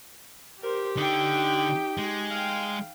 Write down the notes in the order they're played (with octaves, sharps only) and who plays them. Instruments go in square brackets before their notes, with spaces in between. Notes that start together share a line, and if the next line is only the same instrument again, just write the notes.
[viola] G4 [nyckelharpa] A#4 C5
[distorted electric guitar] D3 [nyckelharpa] D#4 G5
[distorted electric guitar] G#3
[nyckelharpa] F5 G5